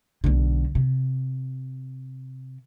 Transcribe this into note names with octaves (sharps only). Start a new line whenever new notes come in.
B1 D3
C3